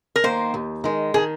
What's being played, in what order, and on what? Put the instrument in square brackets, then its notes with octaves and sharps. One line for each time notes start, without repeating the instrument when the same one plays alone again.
[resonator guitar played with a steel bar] A#4
[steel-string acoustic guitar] D#3 A#3 [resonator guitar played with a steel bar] C5
[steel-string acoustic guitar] D#2
D#3 G#3
[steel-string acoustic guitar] D#3 [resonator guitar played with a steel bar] G#4